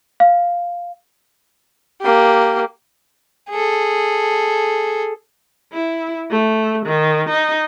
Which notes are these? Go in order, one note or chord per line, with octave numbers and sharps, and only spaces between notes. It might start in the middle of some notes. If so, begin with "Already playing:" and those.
F5
A#3 G4
G#4 A4
E4
A3
D#3
D#4